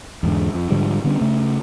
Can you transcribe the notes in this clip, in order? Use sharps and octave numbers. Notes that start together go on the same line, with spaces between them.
E2 G#2 D3
F2
G#2 D3 F3 G3
D3 G3 B3 C#4
C#3 A3